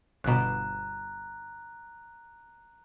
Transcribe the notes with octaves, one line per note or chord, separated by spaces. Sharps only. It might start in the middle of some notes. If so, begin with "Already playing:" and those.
G1 B2 A#5 F#6